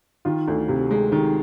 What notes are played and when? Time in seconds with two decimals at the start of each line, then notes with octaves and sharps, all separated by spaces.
0.25 D#3 F4
0.48 D2
0.69 C3
0.91 G#3
1.12 D#3